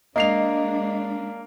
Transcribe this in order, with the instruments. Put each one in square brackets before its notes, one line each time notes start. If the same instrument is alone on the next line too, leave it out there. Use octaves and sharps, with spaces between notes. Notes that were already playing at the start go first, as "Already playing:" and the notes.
[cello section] G#3 D4 [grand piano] A#3 C7 F7 [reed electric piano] D#5